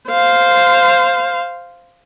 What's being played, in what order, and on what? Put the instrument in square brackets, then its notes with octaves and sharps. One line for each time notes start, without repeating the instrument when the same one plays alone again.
[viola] C5 F5